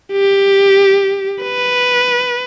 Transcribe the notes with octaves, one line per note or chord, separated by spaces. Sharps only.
G4
B4